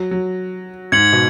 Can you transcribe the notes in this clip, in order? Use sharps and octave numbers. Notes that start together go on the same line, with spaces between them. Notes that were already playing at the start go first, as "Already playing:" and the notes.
Already playing: F#3
F#3
G#2 G#6 C#7 F#7
B2